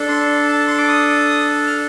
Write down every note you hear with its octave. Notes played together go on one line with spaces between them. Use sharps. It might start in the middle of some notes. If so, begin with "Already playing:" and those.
Already playing: D4 A4
C6
A5
C6
D6
D#6
F6